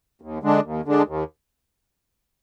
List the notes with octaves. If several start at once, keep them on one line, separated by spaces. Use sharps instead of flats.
D#2
D3 G#3 D4
D#2
D3 G#3 D4
D#2